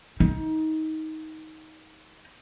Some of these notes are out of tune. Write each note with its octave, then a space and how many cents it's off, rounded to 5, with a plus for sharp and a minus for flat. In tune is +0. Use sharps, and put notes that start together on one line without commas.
D#4 +20